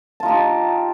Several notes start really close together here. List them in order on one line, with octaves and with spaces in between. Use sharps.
A5 F4 D#4 G4